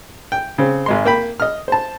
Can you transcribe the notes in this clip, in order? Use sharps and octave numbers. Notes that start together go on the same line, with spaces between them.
G5
C#3 C4
G#1 G#3 C6
A#3 G5 B5
D#5 F6
C5 A5